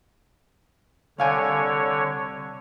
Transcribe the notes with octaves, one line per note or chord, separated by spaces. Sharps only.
C2 D3 C#5 F5 G#5